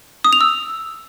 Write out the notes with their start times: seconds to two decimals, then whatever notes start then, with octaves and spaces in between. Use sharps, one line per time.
0.24 D#6
0.33 F7
0.41 E6